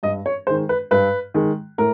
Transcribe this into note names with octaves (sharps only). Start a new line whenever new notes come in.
G2 D#5
C#5
D#3 G#3 C5
B4
G2 B4
D#3 G#3
A2 A#4